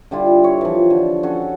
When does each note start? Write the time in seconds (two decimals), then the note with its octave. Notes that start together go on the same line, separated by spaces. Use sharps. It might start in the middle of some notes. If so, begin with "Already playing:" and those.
0.11 D3 G3 E4 F4
0.44 C#5
0.61 E3 F3
0.90 D3
1.23 C#4 F#4 A4